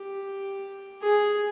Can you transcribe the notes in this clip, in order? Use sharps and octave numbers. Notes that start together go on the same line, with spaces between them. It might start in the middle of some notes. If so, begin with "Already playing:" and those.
Already playing: G4
G#4